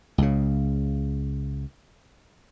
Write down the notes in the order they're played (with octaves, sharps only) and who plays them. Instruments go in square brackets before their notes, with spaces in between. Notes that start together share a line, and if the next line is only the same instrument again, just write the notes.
[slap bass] C#2 C#3